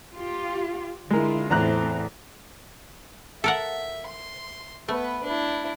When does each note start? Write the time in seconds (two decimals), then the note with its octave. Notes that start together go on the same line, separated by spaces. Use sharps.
0.15 F4 G4
1.11 D3 G#3 E4 F4 A#4
1.50 E2 A2 C4 A#5 F#6
3.44 A4 A#4 E5 F#5
4.07 C6
4.88 A3 B3 B4
5.23 D4 E4